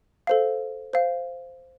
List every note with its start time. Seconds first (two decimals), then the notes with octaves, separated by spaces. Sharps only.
0.27 A4 C5 F5
0.93 C5 F5